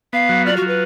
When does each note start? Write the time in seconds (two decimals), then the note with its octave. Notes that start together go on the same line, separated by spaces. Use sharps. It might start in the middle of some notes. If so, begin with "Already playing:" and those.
0.13 B3 F5
0.29 F#3
0.46 F4 D5
0.57 F#4
0.62 F#3
0.68 B4